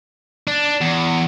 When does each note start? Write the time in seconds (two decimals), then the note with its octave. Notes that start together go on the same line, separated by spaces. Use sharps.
0.47 D4
0.81 E2